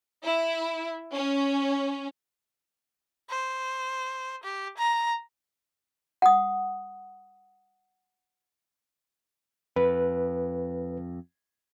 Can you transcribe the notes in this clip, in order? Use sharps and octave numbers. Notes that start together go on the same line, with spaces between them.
E4
C#4
C5
G4
A#5
F#5 D#6
F2 B4